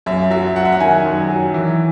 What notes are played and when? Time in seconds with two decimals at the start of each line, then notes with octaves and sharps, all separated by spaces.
0.06 F#2 E5
0.31 F#3 E5
0.56 F#2 F#5
0.65 E5
0.72 F#5
0.80 D#3 G#5
1.06 F#2
1.30 F#3
1.54 E3